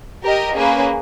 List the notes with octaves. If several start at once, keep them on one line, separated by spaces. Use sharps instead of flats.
G4 A#4 D#5
A#3 C#4 G#4 B4